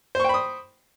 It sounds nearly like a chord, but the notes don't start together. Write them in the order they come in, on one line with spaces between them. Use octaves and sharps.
C5 C#6 G5 B5 D#6